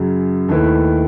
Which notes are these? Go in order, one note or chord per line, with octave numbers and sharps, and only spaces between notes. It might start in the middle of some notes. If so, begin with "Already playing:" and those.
Already playing: F#2 C#3 F#3
D#2 D#3 A3 E4 B4